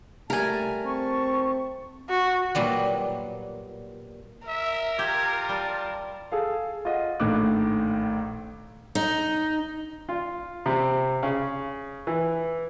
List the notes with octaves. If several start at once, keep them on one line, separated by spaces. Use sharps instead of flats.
G3 A3 A#4 G#5 A5
C4 A5 C#6
F#4
A#2 F#3 G3 B3
A#4 E5
F4 G4 G#6
G3 A5
G#4 A4 F5
F4 D#5 F#5
A#1 A2 D#3 D6 F#6
D#4
F4
C3
C#3
E3